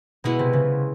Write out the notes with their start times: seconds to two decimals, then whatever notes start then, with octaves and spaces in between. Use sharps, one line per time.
0.24 B2 G#3 B3 E4
0.39 C3
0.53 C#3